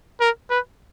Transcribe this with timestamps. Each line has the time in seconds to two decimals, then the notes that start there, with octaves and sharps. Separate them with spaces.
0.20 A#4
0.50 B4